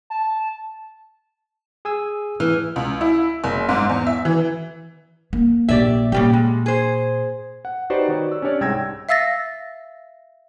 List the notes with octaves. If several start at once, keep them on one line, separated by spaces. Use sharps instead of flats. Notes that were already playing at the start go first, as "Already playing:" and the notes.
A5
G#4 G#5 E6
E3 F6
C#2
E4
F#1
G#2
E2
E5
E3
A#3
A#1 G4 D5 E5
A#2 C#3 G3 G4
G#3
G#4 C5
F#5
D#4 F#4 G4 B4 C5 D5
D#3 F#4 B4 C#5
D5 E6
C#4 D4 G4 C#5 D5
C2 G#2 G5 E6 G#6 A#6
E5 F5 E6 A6 A#6